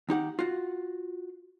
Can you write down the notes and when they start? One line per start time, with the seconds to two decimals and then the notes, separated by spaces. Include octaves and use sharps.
0.09 D#2 D#4 G4 F#5
0.39 F4 F#4